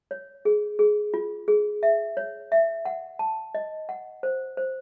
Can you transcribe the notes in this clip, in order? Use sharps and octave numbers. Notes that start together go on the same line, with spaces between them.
C#5
G#4
G#4
F4
G#4
E5
C#5
E5
F#5
A5
D#5
F#5
C5
C5